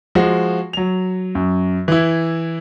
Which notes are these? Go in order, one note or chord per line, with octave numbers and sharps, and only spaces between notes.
F3 G#3 F#4
F#3 F7
F#2
E3 E4